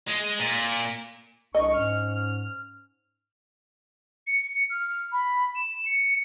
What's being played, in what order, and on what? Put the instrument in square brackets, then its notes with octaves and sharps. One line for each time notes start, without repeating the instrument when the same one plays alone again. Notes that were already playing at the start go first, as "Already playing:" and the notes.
[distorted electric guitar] G#3
A#2
[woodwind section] C2 D4 C#6 [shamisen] D#5
[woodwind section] G#2 C#4 F6
[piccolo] C#7
F6
B5
E7
C#7